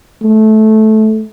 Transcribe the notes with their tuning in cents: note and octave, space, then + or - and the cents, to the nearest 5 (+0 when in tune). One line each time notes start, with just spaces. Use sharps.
A3 -15